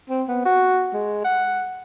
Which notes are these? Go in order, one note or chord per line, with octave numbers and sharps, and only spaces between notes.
C4
B3
F#4
G#3
F#5